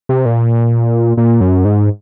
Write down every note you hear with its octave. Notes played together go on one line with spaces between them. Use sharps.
C3
A#2
A#2
F#2
G#2